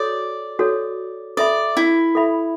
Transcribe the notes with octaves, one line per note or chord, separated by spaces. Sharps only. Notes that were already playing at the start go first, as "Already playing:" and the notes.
Already playing: F#4 A4 C#5 D5
F#4 A4 C#5
A4 D5 E5 B5
E4
A4 E5 B5